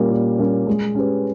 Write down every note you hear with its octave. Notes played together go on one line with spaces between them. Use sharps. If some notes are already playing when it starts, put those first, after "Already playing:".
Already playing: A#2 G3 A#3 C#4
A#2
G3 A#3 C#4
G#3
C#4 G4 B4